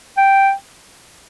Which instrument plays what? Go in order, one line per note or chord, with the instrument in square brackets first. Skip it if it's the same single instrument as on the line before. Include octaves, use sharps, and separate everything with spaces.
[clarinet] G5